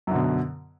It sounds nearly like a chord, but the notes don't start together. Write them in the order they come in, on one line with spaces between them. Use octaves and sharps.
F#2 D3 B2